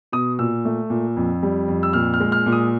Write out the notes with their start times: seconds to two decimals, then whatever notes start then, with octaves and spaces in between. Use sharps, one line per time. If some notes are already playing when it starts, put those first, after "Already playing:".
0.12 B2 D#6
0.39 A#2 E6
0.65 A3
0.90 A#2
1.17 F2
1.43 G3
1.68 F2
1.83 E6
1.93 A#2 F6
2.14 F6
2.20 G#3
2.32 F6
2.46 A#2
2.52 D#6